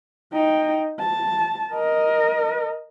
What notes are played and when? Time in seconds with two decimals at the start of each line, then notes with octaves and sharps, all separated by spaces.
0.33 D#4 G5
1.00 A5
1.73 A#4 D#5